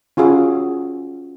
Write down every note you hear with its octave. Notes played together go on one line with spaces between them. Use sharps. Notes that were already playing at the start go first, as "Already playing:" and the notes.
C#4 F4 F#4 G#4